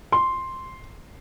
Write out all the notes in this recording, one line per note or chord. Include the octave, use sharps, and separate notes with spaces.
C6